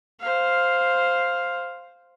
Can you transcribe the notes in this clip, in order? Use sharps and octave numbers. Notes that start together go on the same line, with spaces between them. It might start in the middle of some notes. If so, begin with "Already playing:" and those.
C5 F5